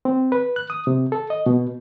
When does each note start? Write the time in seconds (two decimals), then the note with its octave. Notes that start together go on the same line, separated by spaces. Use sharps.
0.05 C4
0.32 B4
0.56 F#6
0.70 D#6
0.87 C3
1.12 A4
1.30 D#5
1.46 B2